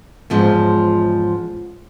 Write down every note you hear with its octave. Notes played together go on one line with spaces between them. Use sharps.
E2 G#2 F3 G#3 C#4